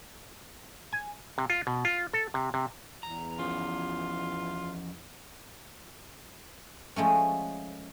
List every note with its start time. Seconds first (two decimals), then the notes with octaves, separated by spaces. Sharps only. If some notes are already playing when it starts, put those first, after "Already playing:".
0.93 G#5
1.38 C3
1.50 F4
1.67 B2
1.85 F4
2.13 A4
2.34 C3
2.54 C3
3.03 E2 A#5
3.39 F3 C#4 F4
6.96 F3 G#3 A3 C#4